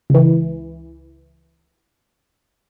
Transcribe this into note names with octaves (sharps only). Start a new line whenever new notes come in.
C#2 E3